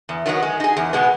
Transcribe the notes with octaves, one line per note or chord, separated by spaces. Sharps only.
E2
D#3 F#3 B3 D#4
G#3
D#4 G#4
E2
B2 G#3 B3